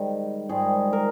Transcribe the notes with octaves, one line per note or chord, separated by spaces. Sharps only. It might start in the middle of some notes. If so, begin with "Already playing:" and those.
Already playing: G#2 D#3 G3
G#2 D#3 G3 G#4
A#4